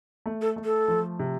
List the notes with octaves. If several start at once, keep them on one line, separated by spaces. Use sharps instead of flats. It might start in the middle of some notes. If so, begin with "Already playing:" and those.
A3
A4
A3
A4
F3
C3